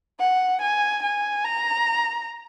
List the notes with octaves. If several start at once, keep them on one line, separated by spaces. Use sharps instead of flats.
F#5
G#5
G#5
A#5